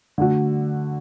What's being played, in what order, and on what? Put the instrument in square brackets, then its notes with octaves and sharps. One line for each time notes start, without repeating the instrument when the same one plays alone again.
[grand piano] D3 A3 F#4